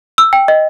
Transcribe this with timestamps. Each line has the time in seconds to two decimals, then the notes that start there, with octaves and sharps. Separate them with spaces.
0.18 E6
0.33 G5
0.48 D#5